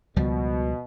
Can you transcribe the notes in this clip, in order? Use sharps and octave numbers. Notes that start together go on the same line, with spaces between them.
C#2 B2 F3 G3